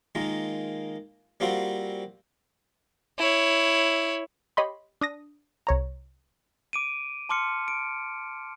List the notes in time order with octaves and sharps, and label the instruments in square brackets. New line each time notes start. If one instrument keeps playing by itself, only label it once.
[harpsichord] D#3 G#3 A#3 F4
G3 A#3 C4 F4 F#4 C5
[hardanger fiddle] E4 C#5
[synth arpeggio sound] G4 C#5 D#5 B5 C6
D4 D#6 A#6
C2 C#5 A#5
[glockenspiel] D6 D7 D#7
A5 C6 D6 F6 C#7
D7